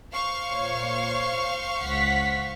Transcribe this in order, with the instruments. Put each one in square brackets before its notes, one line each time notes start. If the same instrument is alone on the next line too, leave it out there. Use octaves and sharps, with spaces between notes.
[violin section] C5 F5 C#6
[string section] A#2 C#5
C#2 F#5 B6